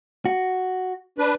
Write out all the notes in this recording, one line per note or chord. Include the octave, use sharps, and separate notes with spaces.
F#4
D4 B4